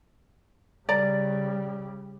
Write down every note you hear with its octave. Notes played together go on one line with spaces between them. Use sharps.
C#3 G3 D5 A#5